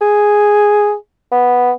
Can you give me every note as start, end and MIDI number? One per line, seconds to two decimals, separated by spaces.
0.01 0.94 68
1.32 1.72 59